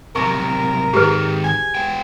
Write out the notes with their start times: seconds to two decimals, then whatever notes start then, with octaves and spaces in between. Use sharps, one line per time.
0.16 B1 C3 A#4 A#5 C#6
0.93 G#2 D#3 G4 G#4 B4
1.44 G#5
1.75 B3 G5